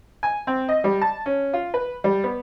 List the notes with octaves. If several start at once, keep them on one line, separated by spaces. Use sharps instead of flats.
G#5
C4
D#5
G3
A5
C#4
F4
B4
G3
B3